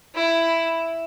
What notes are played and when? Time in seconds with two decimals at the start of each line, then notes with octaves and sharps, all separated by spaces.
0.15 E4